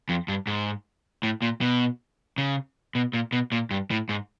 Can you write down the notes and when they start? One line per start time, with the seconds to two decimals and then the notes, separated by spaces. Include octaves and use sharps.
0.09 F2
0.28 G2
0.47 G#2
1.23 A2
1.42 A#2
1.61 B2
2.38 C#3
2.95 B2
3.13 A#2
3.32 B2
3.52 A#2
3.71 G2
3.91 A2
4.09 G#2